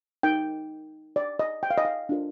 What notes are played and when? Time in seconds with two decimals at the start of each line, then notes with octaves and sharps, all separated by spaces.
0.23 D#4 A#4 G5
1.16 D5
1.39 D#5
1.63 G5
1.71 F5
1.78 D#5
1.85 F5
2.09 D4 F4 A#4